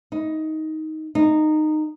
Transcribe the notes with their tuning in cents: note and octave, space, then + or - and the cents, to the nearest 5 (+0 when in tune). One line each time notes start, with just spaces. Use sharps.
D#4 +10
D#4 -15